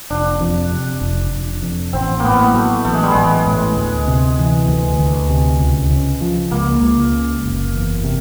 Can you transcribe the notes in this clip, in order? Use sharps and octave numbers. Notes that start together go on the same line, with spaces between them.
F1 D4
F2
C3
F1
F1
F2
A1 C4
A2 A#3 B3
F#3 A3
A1 A3
G#3
G3
A1 G#3
A2
D2
C3
E3
D2
D2
C3
C#2
C#3
F3
C#2 A#3
C#2
C#3
F#1
E2
C3